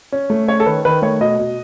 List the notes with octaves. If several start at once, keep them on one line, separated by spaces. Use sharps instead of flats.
C#4
A3
C#4 C#5
A4
D#3 B4
D#3 B4
A3 C#5
B2 D#5
B2